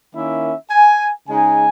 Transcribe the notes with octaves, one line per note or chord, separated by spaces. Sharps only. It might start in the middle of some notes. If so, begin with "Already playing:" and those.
D#3 A#3 C#4 E4 E5
G#5
C#3 G#3 D#4 G#5